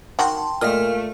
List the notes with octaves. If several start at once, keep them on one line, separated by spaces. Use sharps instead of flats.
D#3 F#4 G5 A5 C6
A#2 G#3 A3 D#5 F5 F6